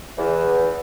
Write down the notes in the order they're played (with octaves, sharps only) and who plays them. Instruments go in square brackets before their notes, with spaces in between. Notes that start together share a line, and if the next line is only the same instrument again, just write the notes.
[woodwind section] E2 E3